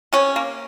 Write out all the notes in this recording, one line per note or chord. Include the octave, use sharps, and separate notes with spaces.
C3 C#4
A#3